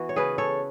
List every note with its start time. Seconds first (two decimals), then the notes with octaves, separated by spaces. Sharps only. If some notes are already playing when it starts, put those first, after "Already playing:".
Already playing: E3 B3 F#4
0.09 C#5
0.16 C#3 G#4 B4
0.38 A4 C#5